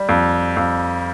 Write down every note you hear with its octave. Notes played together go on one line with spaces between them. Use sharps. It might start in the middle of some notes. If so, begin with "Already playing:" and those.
Already playing: G3
F2
F2